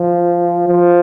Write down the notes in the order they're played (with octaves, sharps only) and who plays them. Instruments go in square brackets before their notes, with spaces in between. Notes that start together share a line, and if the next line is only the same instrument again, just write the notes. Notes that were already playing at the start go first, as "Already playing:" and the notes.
Already playing: [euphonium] F3
F3